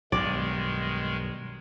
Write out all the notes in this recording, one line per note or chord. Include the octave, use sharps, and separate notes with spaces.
B1 G2 D#3 G#3 D5